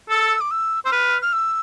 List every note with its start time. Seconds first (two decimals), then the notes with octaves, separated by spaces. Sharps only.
0.10 A4 E6
0.41 D6
0.51 E6
0.85 C5 E6
0.92 B4 F6
1.22 F6
1.33 E6